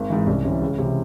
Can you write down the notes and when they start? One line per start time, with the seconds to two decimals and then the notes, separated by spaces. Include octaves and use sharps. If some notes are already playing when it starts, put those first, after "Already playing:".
Already playing: G#1
0.10 G#2 E3
0.27 C2 C#4
0.44 C3 E3 C#4
0.62 C#2
0.78 C3 E3